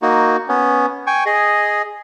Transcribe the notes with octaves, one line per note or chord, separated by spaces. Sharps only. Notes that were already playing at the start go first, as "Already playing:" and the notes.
A#3 D#4 F#4
B3 C#4
G5 G#5 C#6
G#4 D#5